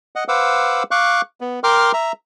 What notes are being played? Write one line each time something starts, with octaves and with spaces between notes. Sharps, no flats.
D#5 F#5
B4 C5 F5 F#5 D6 E6
F5 C#6 D6 F#6
B3
A#4 G5 C6 D6 F6
E5 A#5